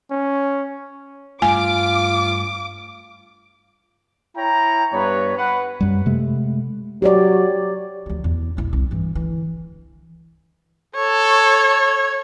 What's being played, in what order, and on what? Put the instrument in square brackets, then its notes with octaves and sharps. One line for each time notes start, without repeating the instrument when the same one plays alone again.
[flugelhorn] C#4
[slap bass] G2 A3 [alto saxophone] F4 [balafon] G#5 [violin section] D6
[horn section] E4 C#5 G5 A#5
G2 B3 B4 C#5
B4 F#5
[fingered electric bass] F#2 G3
C3 G#3 A3
[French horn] F#3 [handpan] G4 C#5 D5
[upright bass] D2 F3
E2
A#1 E4
C2
G2 E3
D3 E3
[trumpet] A4 [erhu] C#5